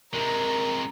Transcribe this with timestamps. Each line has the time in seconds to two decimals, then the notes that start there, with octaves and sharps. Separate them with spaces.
0.14 C3 G#3 A#4 A#5